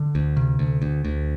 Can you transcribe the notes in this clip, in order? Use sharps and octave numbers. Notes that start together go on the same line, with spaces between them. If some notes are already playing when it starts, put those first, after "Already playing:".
Already playing: D3
D2
C3
D2
D2
D2